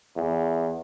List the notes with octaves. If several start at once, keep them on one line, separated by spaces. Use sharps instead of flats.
E2